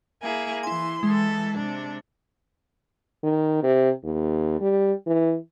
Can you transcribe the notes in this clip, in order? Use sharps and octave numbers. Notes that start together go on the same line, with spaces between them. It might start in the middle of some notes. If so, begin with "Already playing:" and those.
A#3 E4 G#4
E3 E4 G#5 C6
E3 G#3 A4
C3 D4
D#3
C3
D#2
G3
E3